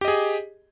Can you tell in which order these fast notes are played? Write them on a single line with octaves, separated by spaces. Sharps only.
G4 D#5 G#4